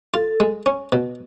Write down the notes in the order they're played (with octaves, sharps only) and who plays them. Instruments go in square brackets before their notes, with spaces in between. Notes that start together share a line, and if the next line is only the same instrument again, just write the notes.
[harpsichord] F4 [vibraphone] A4
[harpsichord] G#3
C#4
B2